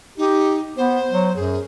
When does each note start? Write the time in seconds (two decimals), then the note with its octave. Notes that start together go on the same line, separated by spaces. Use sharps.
0.17 D#4 G4
0.77 B3 C5
1.11 F#3
1.36 F#2 G#4